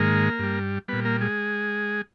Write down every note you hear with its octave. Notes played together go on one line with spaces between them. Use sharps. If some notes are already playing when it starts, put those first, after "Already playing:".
Already playing: G#2 D#3 G#3 A#3 A#4
G2 G3
A#2 G3 B3 B4
A#3 A#4
G#3 G#4